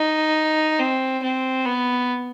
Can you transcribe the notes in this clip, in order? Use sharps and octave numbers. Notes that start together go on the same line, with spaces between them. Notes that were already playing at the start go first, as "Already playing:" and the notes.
Already playing: D#4
C4
C4
B3